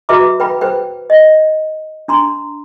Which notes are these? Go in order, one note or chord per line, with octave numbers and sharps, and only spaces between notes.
F#4 B4 E5 A#5 D6
B4 G5 B5
B4 C5 G5
D#5
D4 A#5 C6